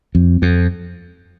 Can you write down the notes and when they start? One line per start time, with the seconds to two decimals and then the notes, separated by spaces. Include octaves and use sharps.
0.15 F2
0.42 F2